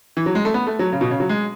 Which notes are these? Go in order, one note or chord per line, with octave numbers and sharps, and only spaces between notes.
E3
F#3
G#3
A3
B3
A3
F#3
C#3
B2
C#3
F#3
G#3